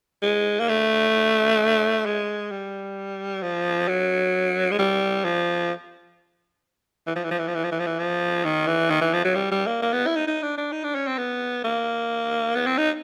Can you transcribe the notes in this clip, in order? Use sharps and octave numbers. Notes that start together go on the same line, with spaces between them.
G#3
A#3
A3
G#3
G3
F3
F#3
G#3
G3
F3
E3
F3
E3
F3
E3
F3
E3
F3
E3
F3
E3
F3
D#3
E3
D#3
E3
F3
F#3
G3
G3
A#3
A#3
B3
E4
D#4
D#4
D4
D4
D#4
D4
C#4
C4
B3
A#3
B3
C4
D#4